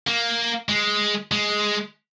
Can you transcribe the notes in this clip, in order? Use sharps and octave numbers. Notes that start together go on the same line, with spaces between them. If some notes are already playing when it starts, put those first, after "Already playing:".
A#3
G#3
G#3